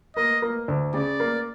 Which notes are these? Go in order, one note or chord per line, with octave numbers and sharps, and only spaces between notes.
A#3 D#5
A#3
D2
C#3 D5
A#3